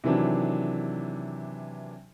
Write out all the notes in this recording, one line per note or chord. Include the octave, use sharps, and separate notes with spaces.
C3 D#3 E3 F#3 D4